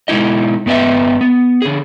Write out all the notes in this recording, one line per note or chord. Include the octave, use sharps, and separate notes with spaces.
B2 G#3 D#4 E4 D#5
G2 B3 B4 D#5 E5
B3
D3 G#4